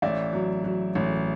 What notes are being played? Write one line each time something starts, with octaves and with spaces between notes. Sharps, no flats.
A1 D5 E5
F#3
F#3
A1